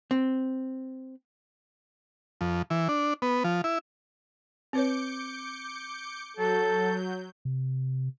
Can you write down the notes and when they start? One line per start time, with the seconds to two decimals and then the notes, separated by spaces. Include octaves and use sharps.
0.11 C4
2.41 F2
2.70 E3
2.89 D4
3.22 B3
3.44 F3
3.64 E4
4.73 C4 B4 C#5 D6 G6 C#7
6.37 F#3 A4 G6
7.45 C3